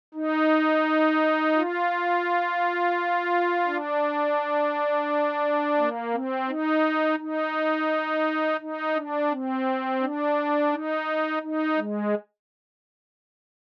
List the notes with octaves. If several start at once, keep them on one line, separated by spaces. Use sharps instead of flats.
D#4
F4
D4
A#3
C4
D#4
D#4
D#4
D4
C4
D4
D#4
D#4
G#3